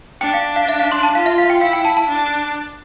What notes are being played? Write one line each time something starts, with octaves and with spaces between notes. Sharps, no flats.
D4 G5
F5
F5
E5
F5
C6
A5
F4 F5
E5
F5
G5
E4 F5
G5
A5
A5
D4